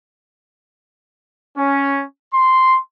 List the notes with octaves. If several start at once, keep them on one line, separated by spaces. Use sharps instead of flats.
C#4
C6